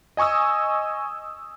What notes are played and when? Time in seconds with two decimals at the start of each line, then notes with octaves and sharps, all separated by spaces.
0.17 D#5 G#5 C#6 D#6 E6